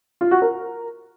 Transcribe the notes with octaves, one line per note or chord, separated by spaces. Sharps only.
F4
F#4
A#4